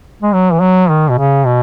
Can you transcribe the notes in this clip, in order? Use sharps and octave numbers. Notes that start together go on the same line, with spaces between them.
G#3
F#3
E3
F#3
D#3
B2
C#3
B2